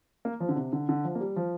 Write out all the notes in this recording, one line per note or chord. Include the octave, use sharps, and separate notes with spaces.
A#3
F3
D3
C3
D3
D3
F3
A#3
G3
F3